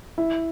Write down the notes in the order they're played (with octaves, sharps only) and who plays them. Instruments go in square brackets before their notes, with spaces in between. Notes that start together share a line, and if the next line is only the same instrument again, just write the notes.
[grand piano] E4